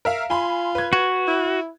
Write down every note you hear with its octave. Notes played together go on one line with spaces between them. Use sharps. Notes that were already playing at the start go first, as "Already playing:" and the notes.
A#4 E5 F5
F4 G#5 B5 C6
B4 G#6
F#4
E4